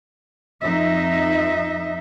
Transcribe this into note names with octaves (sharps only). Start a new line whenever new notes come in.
F2 D#4 D#5 E5